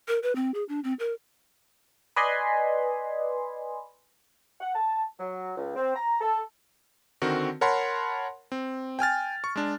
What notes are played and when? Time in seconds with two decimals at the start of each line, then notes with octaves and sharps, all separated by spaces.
0.08 A#4
0.23 B4
0.35 C4
0.54 G#4
0.69 D4
0.84 C4
0.99 A#4
2.16 B4 D5 D#5 G#5 B5 C6
4.61 F#5
4.75 A5
5.19 F#3
5.57 C#2
5.75 C4
5.96 A#5
6.21 A4
7.22 D3 D#3 C4 F#4 A#4
7.61 A#4 C#5 F#5 A5 B5 C6
8.52 C4
8.99 G5 G#5 F6 A6
9.44 C#6
9.56 G#3 D4